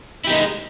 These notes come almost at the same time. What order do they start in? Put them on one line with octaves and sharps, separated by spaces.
E4 G4 D#4 G#3